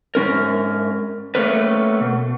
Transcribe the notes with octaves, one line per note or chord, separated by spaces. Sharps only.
G#2 G3 C#4 A#4
A3 A#3 C#4 A#4 B4
B2